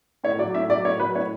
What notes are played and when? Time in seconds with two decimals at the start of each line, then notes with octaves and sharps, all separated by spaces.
0.24 A2 C#5
0.39 F#3 D5
0.55 A2 E5
0.69 F#3 D5
0.85 A2 C#5
1.00 F#3 B4
1.15 A2 C#5